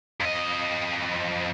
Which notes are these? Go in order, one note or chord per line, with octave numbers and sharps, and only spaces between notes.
F2 D#5